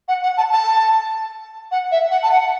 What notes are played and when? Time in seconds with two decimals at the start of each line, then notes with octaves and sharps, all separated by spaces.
0.08 F#5
0.23 F#5
0.37 A5
0.52 A5
1.71 F#5
1.91 E5
2.11 F#5
2.23 A5
2.31 F#5